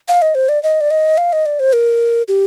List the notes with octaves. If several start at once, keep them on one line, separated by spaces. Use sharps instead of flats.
F5
D#5
C5
D5
D#5
D5
D#5
F5
D#5
D5
C5
A#4
G4